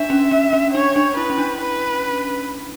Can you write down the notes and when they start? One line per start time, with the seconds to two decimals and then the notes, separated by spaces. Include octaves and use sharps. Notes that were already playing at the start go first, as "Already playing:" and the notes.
Already playing: D4 E5
0.10 C#4
0.31 C#4
0.53 C#4
0.73 D4 C#5
0.96 D4
1.17 E4 B4
1.30 C#4
1.38 D4
1.61 B4